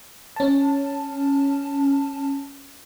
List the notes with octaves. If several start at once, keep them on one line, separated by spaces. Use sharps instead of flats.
C#4 A5